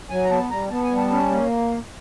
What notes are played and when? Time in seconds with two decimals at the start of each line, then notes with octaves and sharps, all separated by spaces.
0.10 F#3 G#5
0.25 A#5
0.31 B3 A5
0.50 G3 A#5
0.71 B3 A5
0.84 G#5
0.91 G3
0.97 A5
1.11 C#4
1.31 A#3